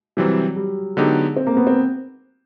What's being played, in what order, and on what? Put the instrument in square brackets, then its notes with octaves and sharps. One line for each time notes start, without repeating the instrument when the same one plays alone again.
[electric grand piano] C3 E3 G3 C4 [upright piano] F#3
[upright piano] G3
[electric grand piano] D3 F#3 B3 D#4 G4 [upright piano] G#3
[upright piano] C4
A#3
B3
C4